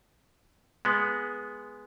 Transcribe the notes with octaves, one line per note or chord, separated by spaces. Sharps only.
G#3 B3